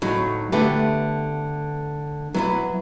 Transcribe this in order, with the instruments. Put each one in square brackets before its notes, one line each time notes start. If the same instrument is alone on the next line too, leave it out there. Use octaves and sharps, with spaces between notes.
[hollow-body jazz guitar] A2 F#3 [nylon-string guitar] D#4
[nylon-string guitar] D3 A3 B3 [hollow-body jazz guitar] G4 A4 B4
[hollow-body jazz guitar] F#3 E4 B4 [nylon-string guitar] B3